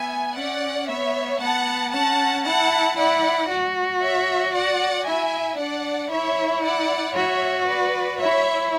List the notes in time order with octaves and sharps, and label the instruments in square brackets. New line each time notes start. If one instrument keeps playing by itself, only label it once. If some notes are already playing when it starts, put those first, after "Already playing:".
Already playing: [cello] B3 [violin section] E5 G#5
[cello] C#4 [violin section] D5 F#5
[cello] B3 [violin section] C#5 E5
[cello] B3 [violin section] F#5 A5
[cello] C#4 [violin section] F#5 A5
[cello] E4 [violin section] F#5 A5
[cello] E4 [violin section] D5 F#5
[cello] F#4
[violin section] C#5 E5
D5 F#5
[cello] E4 [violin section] E5 G#5
[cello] D4 [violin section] D5 F#5
[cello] E4 [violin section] C#5 E5
[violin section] D5 F#5
[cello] F#4 [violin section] C#5 E5
[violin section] B4 D5
[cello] E4 [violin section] C#5 E5